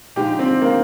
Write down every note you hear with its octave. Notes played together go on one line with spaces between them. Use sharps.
D3 F3 G#3 D#4 G4
C4
A#3